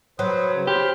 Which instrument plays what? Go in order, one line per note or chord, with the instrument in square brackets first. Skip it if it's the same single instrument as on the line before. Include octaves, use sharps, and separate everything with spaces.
[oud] F#3 [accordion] B4 C5 D#6
[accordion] C#3
[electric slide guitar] G4 [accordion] C5 B5 F6